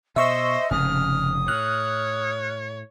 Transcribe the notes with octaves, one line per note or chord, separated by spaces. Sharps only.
B2 C5 D#5 E5 C#6 E6
F1 G#2 C#3 D#6 F6
A2 C#5 F6 F#6